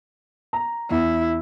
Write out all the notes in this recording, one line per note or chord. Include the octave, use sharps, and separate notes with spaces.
A#5
E2 E4